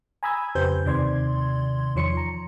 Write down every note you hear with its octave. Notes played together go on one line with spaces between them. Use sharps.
G#5 A#5 B5 D#6 E6 G#6
F2 C#3 G4 B4 C5 G6
D#2 C3 D#3 D5 C6 G#6
E2 D#3 F3 C#5 C6 C#7
A#5